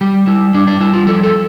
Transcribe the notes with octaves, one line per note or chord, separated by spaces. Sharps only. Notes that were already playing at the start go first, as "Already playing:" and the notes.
G3 G4
G3 E4
G3 D4
D4
G3 E4
F4
F3 A4
A4